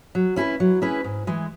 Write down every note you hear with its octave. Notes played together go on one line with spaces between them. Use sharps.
F#3
C#4 E4 G#4 B4
F#3
C#4 E4 G#4 B4
G#2
E3 G#3